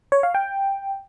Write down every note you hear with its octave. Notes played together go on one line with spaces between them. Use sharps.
C#5
F5
G5